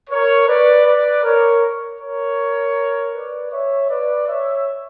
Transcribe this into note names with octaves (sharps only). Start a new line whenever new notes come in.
A#4 C#5
B4 D5
B4 D5
A#4 C#5
A#4 C#5
B4 D5
C#5 E5
B4 D5
C#5 E5